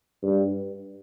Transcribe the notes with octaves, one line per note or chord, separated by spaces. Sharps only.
G2